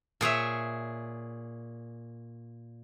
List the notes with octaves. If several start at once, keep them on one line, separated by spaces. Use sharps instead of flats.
A#2 G#4 C#5 E5